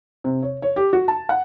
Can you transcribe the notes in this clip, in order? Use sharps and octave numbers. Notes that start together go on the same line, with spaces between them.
C3
C#5
C#5
G4
F#4
A5
F#5